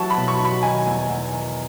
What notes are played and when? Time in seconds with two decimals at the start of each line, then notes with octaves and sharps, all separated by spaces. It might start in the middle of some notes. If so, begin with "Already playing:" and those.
Already playing: E3 F#3 A5 C#6
0.10 B5
0.17 B2
0.28 C#6
0.39 D#4
0.45 B5
0.63 D#3 G#5
0.86 E2
1.09 E2
1.33 D#3